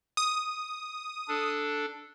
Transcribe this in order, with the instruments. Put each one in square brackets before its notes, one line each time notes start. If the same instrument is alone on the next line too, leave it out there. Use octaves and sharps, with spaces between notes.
[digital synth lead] D#6
[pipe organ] D4 A4